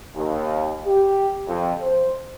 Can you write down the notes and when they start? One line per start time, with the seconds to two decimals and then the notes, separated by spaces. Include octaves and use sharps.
0.15 D#2
0.87 G4
1.48 F2
1.82 C5